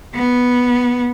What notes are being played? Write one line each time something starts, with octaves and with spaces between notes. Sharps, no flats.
B3